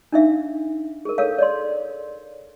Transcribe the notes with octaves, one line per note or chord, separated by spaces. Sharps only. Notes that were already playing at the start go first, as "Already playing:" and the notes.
D4 D#4 E5 F5
G#4 A#4
A4 A#4 C#5 F5
C#5 D5 C6